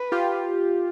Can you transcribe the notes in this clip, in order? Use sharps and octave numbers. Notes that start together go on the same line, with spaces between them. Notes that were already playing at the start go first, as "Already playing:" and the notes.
Already playing: B4
F4 G4